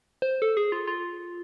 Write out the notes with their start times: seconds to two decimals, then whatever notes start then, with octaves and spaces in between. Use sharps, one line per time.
0.22 C5
0.42 A4
0.57 G#4
0.72 F4
0.87 F4